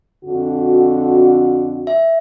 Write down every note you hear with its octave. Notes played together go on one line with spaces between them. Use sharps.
F2 D3 F#4
E5